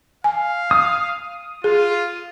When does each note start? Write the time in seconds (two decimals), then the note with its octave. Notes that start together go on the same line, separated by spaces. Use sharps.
0.24 F5 G#5
0.71 D#6
1.64 F4 G#4